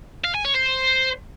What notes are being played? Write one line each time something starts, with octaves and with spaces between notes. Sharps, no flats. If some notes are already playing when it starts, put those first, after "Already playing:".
F5
G#5
C#5
C5